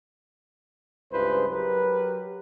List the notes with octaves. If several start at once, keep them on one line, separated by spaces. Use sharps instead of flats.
C#2 G2 E4 G#4 B4 C5
F#3 G4 A#4 B4